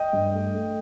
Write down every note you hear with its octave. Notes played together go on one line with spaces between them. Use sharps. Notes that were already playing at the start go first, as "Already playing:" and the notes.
Already playing: D#5 G5
G2
A3
A3